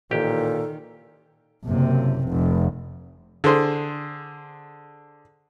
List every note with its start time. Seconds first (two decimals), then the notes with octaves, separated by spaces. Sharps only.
0.11 A1 A#2 D#3 G4 A4
1.66 F#1 C3
2.29 F1
3.44 D3 G#4 C5